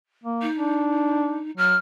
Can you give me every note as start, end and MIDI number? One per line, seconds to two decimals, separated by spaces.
0.24 0.47 58
0.42 1.51 63
0.57 1.41 62
1.57 1.75 54
1.57 1.75 89